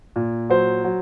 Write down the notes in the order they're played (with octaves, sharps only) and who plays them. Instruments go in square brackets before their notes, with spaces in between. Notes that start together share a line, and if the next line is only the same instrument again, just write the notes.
[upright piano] A#2
F#3 C5
F#3